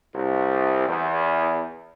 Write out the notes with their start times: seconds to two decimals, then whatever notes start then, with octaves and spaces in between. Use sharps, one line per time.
0.14 C2
0.88 E2